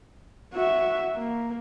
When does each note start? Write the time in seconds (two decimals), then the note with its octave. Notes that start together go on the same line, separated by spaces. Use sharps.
0.54 F#4 E5
1.15 A#3